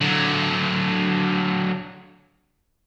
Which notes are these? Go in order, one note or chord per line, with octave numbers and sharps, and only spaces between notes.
D3 F#3